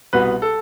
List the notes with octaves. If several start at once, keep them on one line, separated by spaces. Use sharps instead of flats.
C2 B2 B3 B4
A4